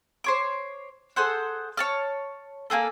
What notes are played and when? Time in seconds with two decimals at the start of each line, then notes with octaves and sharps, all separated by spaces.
0.24 C5 C#5 D6
1.16 G#4 A4 C5 F#5
1.77 C#5 A5 F6
2.70 A#3 B3 G#4 A4